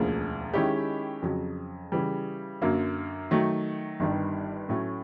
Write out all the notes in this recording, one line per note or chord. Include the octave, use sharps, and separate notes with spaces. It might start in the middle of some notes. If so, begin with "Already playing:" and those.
Already playing: E1 D2 C#3 F3 A#3
D#3 G#3 C#4 E4 G4
F2 C#3 F#3
C#3 E3 G3
F#2 D3 F#3 A#3
D#3 F#3 A3
G1 G2 D#3 G3
A2 F#3 A3 C#4